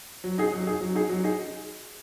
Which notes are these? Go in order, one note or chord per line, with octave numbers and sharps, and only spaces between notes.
F#3
D#4 G#4
F#3
D#4 G#4
F#3
D#4 G#4
F#3
D#4 G#4